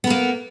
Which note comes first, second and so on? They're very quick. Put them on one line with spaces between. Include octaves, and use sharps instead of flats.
B3 A#4 A#3